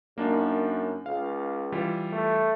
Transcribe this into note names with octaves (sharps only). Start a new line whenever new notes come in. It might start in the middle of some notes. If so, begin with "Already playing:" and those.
F#2 A#3 D4 D#4
C#2 F5
E3 G3 F4
A3